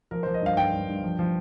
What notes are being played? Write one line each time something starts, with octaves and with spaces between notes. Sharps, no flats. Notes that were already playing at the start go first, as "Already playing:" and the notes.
F3 A#4
F3 C5
D#5
G2 F5
G2 G5
G2
G2
F3
F3